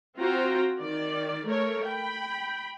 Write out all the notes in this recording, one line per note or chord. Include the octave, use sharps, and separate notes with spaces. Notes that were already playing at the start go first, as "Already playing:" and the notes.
C4 F4 F#4 C5 G5 A#5
D#3 D5
A3 A#4 C#5
G5 B5